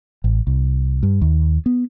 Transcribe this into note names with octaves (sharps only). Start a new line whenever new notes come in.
A1
C2
G2
D#2
B3